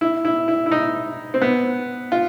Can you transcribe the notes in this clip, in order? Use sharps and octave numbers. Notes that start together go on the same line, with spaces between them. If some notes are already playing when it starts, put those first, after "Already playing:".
E4
E4
E4
E4
D#4
C4
B3
F4